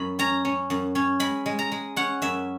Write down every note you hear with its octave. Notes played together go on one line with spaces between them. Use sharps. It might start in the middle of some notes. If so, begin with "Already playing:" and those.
Already playing: F#2 B5
C#4 A#5
C#4
F#2
C#4
G#3 B5
G#3
A#5
G#3
C#4 F#5
F#2 E5